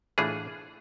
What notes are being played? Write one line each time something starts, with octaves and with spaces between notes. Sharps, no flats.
A2 E3 A3 D4 F4 G#4